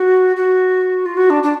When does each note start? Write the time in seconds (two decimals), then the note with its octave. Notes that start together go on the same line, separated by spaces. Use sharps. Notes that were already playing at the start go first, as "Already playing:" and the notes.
Already playing: F#4
0.36 F#4
1.06 F4
1.17 F#4
1.30 D4
1.43 D4